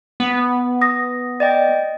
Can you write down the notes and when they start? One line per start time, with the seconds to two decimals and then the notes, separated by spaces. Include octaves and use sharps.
0.20 B3
0.81 D#6 A#6
1.40 D5 D#5 G5